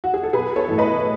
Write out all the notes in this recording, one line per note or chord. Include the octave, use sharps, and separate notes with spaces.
F#4
G#4
A4
B1 G#4 B4
A4 C#5
A2 E3
B4 D#5